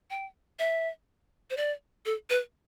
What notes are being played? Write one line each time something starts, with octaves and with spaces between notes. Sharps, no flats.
G5
E5
C5
D5
A4
B4